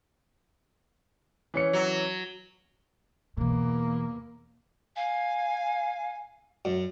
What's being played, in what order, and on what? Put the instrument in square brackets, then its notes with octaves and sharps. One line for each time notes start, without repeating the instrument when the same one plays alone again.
[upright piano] E3 C#4 C#7
[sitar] F#3
[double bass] E2 A#3 [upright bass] B2 E3
[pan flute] F5 [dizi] G#5
[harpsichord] F#2